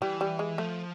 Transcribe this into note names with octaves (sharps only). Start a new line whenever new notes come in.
E3 G3
G3
G#3
F3 A3